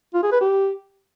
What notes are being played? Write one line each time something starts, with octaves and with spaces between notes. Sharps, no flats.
F4
G#4
B4
G4